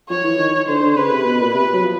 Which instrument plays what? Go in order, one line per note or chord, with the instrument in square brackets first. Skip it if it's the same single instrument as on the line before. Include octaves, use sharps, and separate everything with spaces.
[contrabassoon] F3 [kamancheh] C#5
[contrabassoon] E3
D#3
[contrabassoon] D3 [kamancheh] C5
[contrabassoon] D3
[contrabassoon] C#3 [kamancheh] B4
[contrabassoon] C3
B2
A#2
[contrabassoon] C3 [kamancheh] B4
[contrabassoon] F#3
F3